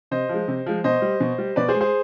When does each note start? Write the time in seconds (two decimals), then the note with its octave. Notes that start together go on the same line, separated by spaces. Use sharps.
0.11 C3 C5 D#5
0.29 F3 G#3
0.48 C3
0.66 F3 G#3
0.84 B2 C5 D#5
1.02 G3
1.20 B2
1.38 G3
1.56 B2 B4 D5
1.69 G#4 C5
1.74 G#3
1.81 G#4 C5